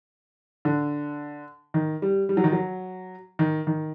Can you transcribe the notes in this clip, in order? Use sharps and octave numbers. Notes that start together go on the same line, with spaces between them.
D3
D#3
G3
G3
F#3
D#3
F#3
D#3
D#3